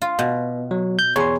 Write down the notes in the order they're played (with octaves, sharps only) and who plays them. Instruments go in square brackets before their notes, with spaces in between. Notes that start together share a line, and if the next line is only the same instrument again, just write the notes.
[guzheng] F4
B2
[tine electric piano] F#3
G6
[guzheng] E2 [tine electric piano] C#5 C6